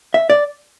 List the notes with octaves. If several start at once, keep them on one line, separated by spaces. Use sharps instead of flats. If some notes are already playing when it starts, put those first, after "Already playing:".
E5
D5